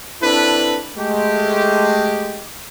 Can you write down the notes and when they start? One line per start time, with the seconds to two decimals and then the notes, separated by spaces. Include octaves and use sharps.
0.22 C4 D4 E4 A4 B4
0.96 G#3 A3 G4